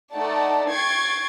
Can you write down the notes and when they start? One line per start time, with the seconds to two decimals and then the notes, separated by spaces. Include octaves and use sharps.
0.13 A3 D#4 A4 D5 F#5 A5
0.70 G5 C#6 G#6 A6 C7